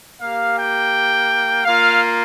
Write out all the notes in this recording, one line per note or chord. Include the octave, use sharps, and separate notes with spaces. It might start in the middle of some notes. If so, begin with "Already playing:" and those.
A#3 G4 F5
G5
A#3 F4 F5